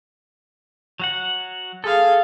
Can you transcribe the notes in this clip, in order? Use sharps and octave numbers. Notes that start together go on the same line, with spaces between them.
F#3 F#4 F#5
G#4 A4 F5